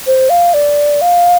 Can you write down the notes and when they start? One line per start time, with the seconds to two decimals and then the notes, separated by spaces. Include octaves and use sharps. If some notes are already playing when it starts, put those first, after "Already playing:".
0.07 C5
0.30 F5
0.54 D5
1.01 F5